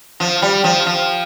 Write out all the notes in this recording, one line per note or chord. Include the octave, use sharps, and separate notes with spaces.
F3
G3
F3
F3